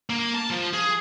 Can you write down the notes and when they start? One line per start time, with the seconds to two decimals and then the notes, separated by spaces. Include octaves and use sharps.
0.10 A#3
0.35 A5
0.51 F3
0.73 G#4